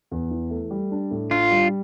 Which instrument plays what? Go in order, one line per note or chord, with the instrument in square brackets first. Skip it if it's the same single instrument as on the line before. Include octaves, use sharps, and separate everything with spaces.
[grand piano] E2
E3
A3
G3
D4
A2
[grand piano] D4 [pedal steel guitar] F4
[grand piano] G3